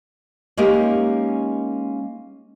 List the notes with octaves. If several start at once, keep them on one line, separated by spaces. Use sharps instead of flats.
G#3 A#3 C#4 D#4 G4 A#4